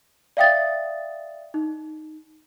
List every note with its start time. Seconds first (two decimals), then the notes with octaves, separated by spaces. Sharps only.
0.37 D5 E5 F5 G5 D#6 A6
1.54 D#4